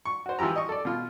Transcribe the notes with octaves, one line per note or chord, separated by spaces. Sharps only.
C#6
F#4 C5
E3 F3 E4 G4 A#5
D#5 C#6
A4 D5
B2 F4